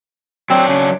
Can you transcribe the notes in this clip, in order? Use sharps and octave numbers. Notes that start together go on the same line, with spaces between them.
F#3 C4 D4
C#3